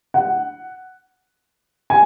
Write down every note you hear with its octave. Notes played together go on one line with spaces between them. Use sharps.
F#5
G#5